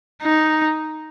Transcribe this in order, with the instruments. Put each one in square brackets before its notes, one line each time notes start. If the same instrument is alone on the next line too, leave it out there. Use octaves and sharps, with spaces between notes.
[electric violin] D#4